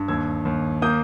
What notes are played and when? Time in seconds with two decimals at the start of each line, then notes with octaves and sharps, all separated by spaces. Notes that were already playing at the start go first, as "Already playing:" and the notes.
Already playing: G2
0.08 D#2 E6 G#6
0.45 D#2
0.82 A#3 D#6 G6